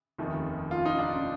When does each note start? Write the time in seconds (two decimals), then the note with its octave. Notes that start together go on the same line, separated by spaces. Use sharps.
0.18 F1 D#2 D#3 A3
0.71 F4
0.85 D#4
0.99 D4 F4